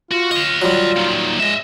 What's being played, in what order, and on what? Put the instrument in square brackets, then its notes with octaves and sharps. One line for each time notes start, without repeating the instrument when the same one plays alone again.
[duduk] F4 [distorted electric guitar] F#4
[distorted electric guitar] D#5 F5 [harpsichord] C#6
[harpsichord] F#3 G3 [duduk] F4
[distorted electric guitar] A#2 D#3
[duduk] G#3 [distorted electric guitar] D#5 E5